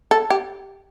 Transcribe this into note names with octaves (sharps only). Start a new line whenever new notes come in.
A4
G4